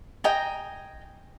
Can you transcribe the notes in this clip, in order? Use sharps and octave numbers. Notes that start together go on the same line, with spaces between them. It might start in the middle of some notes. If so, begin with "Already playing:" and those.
D#5 G5 G#5 A#5